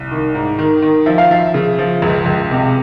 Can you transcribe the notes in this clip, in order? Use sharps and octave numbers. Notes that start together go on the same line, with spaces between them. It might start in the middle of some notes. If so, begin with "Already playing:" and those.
Already playing: C2
D#3
G#2
D#3
D#3
F3 E5
F5
F3 E5
C#3
F3
C#2
C#2
C3